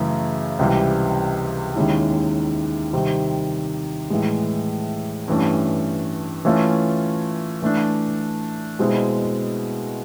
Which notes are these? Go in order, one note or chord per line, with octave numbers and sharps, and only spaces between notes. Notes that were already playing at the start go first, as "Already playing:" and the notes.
Already playing: F#2 C#3 E3 A3 C#4
C#2 C3 E3 G3
D#2 D#3 G#3 C#4 E4
C3 D#3 G3 C4
A2 E3 G#3
G2 E3 A3 C#4
E3 A3 C#4 F4
E3 A3 D4
B2 G#3 C4 E4